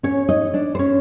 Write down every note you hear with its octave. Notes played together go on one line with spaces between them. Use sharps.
C#4 C#5
D#4 D#5
D4 D5
C5
C#4 C#5